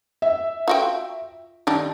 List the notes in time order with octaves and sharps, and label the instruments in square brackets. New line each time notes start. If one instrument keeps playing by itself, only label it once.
[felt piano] E5
[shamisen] F4 F#4 G5
[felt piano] D#3 [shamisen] G3 D4 D#4